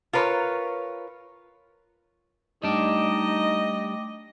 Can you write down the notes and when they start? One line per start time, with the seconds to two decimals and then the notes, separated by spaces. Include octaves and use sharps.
0.13 F4 A#4 B4 C#5
2.64 G3 A3 D4 D#4 D#5 G5 D6